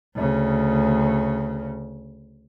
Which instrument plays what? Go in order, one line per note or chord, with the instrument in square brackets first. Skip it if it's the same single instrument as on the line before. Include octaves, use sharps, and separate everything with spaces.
[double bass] D2 C#3